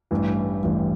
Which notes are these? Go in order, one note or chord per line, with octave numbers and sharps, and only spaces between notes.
A1 G2 E3
A1 G2 E3